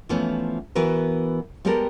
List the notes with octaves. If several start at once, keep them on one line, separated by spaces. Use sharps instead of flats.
E3 F3 A3 B3 C#4
E3 B3 F#4 A#4 B4
G3 G#3 B3 G4 A4 A#4